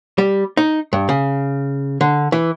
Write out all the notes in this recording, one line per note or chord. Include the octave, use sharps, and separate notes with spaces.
G3
D#4
G2
C#3
D3
E3